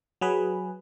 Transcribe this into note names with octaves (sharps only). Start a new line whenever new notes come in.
F#3 G#4 B4